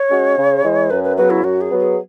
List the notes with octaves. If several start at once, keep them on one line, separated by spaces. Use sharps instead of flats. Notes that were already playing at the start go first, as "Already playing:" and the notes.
Already playing: C#5
G#3 C#4 F#4
C#3
E3 G#3
F#2 B4
B4
C#3 F#3 B3 B4
E4
F#2 F#4
G#4
F#3 B3
G#4